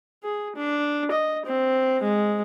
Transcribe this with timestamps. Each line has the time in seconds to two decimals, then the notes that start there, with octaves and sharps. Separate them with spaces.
0.23 G#4
0.56 D4
1.11 D#5
1.45 C4
2.02 G#3